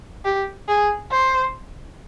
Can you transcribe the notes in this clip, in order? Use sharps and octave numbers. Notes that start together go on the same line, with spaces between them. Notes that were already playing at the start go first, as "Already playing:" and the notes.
G4
G#4
C5